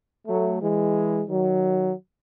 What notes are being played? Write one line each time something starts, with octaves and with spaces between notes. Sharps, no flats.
F#3 A3
E3 G#3
D#3 F#3